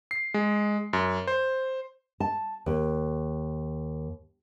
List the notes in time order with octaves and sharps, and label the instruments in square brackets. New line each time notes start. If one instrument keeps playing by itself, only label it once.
[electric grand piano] C7
G#3
F#2
C5
[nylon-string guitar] A5
D#2